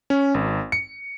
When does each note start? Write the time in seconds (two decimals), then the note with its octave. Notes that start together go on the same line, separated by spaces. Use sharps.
0.10 C#4
0.34 G#1
0.72 C#7